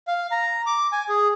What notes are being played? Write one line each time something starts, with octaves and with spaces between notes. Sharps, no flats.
F5
A#5
D6
G#5
G#4